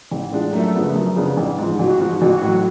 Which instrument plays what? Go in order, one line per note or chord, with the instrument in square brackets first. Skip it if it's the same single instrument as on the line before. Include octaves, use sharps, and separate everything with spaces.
[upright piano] A1
A2 G#3 D4 F4
[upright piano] F#2 [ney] A3
[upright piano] C#3 F3 B3 D4
F#2
C#3 F3 B3 D4
A1
G#2 F3
[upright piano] A1 [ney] F#4
[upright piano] G#2 F3
[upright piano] A1 [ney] F#4
[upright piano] A2 F#3